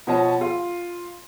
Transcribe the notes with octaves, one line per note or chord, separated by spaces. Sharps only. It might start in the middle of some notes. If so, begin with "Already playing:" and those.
B2 F3 C#5 D#5 A5
F4